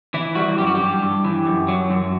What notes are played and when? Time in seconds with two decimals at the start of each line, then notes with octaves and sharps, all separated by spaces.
0.14 E3 E4
0.35 G3 F#4
0.58 F#2 G4
0.67 F#4
0.75 G4
0.80 G2
1.02 G2
1.24 E3
1.46 F#2
1.68 F#3
1.90 F#2